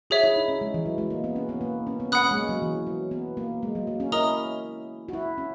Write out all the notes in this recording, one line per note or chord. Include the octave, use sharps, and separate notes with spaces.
F#4 G#4 C#5 E5
E4
D#4
C#4
G#3
E3
F#3
G#3
A#3
B3
C#4
B3
A#3
C#4
B3
C#4 F#5 B5 D#6 F#6
C#4
G#3
A#3
F#3
E3
F#3
B3
A#3
G#3
F#3
A#3
C#4
E4 A#4 D#5 A#5 D#6
F#4
E4
C#4